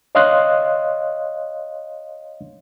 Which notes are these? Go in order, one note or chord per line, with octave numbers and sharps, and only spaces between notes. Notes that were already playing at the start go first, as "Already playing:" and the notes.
C#5 D#5 F5 C6 D#6 F#6